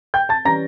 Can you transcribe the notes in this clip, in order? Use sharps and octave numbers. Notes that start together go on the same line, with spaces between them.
G5 G6
A5 A6
E3 G3 C#4 A#5 A#6